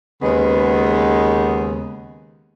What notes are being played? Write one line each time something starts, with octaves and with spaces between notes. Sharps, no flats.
D#2 C#3 G#3 B3